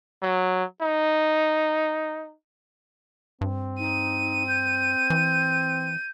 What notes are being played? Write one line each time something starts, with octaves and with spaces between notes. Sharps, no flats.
F#3
D#4
G2 C4
D#4 D#7
G6
E3